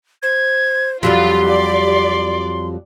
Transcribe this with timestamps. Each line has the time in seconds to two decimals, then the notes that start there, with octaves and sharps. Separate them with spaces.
0.23 C5 G#6
1.03 F2 F#3 G3 F4 G4 C6
1.49 D5